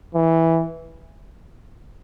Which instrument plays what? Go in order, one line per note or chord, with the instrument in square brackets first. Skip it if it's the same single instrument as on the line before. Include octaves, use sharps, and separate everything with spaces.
[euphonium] E3